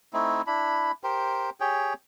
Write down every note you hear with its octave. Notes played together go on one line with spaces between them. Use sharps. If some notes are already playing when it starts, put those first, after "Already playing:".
A3 C4 D#4 E4
D4 E4 B5
G4 A#4 C5
G4 G#4 C#5 G5